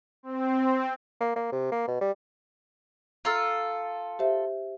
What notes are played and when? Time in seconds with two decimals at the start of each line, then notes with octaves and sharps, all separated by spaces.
0.23 C4
1.21 A#3
1.36 A#3
1.52 C3
1.72 A#3
1.88 B2
2.01 G3
3.25 F4 A4 A#5 F6
4.19 G4 C5 E5